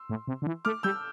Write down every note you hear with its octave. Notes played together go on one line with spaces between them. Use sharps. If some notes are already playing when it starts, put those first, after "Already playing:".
Already playing: C6 E6
A2
C3
D3
E3
A3 D6 F6
G3 E6 G6